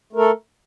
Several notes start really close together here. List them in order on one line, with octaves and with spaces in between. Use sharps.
A3 A#4 A4